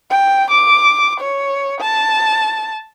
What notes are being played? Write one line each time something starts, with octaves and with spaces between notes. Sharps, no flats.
G5
D6
C#5
A5